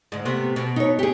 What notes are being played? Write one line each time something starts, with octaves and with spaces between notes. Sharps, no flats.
D2 G#2
C3 A3 B3
B2
D#4 C#5
G4 G#4